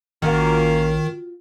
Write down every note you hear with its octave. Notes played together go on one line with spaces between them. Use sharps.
A#1 D#3 A#3 C#4 F4 F#4 A#4